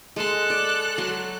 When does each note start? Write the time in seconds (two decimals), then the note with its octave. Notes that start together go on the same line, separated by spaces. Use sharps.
0.16 G#3 A4 C6 F#6
0.50 D5
0.98 F#3 C6